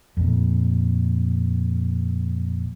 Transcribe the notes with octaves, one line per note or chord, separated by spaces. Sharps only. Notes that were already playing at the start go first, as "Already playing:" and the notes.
F2 A#2